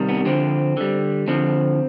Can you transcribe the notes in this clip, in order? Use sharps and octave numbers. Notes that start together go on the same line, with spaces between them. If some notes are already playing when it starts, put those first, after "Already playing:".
Already playing: C3 D#3 G3
B3
D3 F3 C4
D3 G3
D3 F3 C4